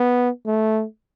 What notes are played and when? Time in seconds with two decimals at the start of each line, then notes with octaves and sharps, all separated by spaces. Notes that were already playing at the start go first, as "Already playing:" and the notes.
Already playing: B3
0.46 A3